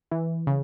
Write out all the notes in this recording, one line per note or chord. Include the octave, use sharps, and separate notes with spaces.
E3
C#3